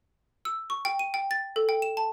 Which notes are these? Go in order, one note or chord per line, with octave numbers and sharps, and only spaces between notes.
E6
C#6
G5
D#7
G5
A6
A4
G5
E7
A5